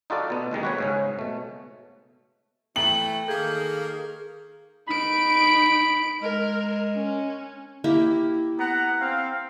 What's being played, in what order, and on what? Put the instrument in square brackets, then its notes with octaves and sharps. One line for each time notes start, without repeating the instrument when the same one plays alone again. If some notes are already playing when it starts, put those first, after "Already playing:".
[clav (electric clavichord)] D#4 F4 F#4 A4 D5
B2 B3
D#2 B2 D#3 G#3
F#4 B4 C#5
G#2 C#3 C#4
B2 A3
[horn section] E3 A3 [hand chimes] G5 A#5 [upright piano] F#7
[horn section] D#3 A#3 [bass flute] G#4 [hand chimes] A4 G6 G#6
[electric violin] D#4 D7 [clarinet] B5
[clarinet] G#3 [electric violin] A#4
[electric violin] C#4
[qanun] A#3 E4 G4
[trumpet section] B3 F#5 A#5
C4 F5